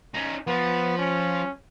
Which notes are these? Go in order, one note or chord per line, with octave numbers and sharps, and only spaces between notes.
C#4 D#4
F3 B3
C#4